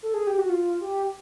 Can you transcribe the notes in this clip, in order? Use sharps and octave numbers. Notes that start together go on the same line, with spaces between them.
A4
G#4
G4
F#4
F4
G4